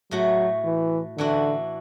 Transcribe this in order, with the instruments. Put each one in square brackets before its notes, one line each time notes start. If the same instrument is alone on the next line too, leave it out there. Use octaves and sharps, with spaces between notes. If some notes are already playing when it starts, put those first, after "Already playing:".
[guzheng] A2 A3 F#4 [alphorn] F#3
[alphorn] E3
[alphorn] D3 [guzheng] E3 D4 F#4